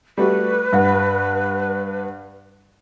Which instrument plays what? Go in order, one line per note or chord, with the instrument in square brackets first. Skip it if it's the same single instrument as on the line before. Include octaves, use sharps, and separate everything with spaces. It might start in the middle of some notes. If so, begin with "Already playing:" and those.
[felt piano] G3 A3 F#4 [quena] B4
[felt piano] G2 F#5